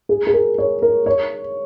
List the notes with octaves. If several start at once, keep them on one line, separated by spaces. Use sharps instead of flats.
G#4
G#4
A#4
C#5
A#4
C#5